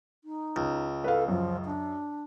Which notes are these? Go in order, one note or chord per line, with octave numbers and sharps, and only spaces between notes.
D#4
C#2
A4 B4 F5
F#2 F3
D4